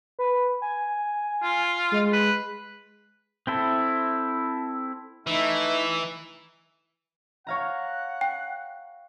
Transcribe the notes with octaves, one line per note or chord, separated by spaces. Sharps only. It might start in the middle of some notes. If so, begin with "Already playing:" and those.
B4
G#5
F4
G#3
B4
C4 E4 A4
E3 A3 D#4 E4 E5
C#5 F5 F#5 A#5
G5